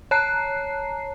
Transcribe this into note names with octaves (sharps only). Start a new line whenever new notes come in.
C#5 A5 A#5 F#6 C7